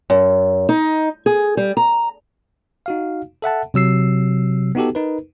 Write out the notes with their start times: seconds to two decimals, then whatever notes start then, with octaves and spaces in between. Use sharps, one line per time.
0.10 F#2
0.69 D#4
1.26 G#4
1.57 G3
1.77 A#5
2.86 D#4 F#4 F5
3.42 A4 E5 F#5 A5
3.74 C3 F#3 E6 C7
4.75 B3 D#4 F#4 G4 A4
4.95 D#4 A#4 B4